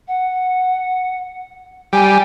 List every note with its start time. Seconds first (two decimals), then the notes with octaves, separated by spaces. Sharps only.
0.08 F#5
1.93 G3 G#5